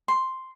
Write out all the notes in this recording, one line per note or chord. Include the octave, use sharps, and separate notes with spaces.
C6